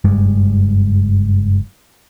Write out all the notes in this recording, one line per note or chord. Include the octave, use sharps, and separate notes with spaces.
F#1 G2 G3 G#3